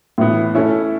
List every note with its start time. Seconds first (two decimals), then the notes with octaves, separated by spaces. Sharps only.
0.18 A2 E3 B3
0.55 A3 C#4 E4